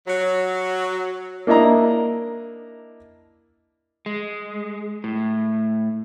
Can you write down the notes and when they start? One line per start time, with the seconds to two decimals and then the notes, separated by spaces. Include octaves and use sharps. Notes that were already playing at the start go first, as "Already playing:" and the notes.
0.07 F#3
1.47 A#3 D4 E4 D#5 A#5
4.06 G#3
5.04 A2